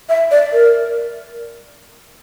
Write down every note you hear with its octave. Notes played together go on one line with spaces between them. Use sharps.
E5
D5
A#4